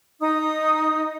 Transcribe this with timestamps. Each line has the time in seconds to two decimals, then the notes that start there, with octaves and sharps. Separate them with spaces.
0.20 D#4 D#6